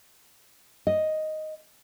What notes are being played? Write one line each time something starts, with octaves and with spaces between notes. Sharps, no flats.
D#5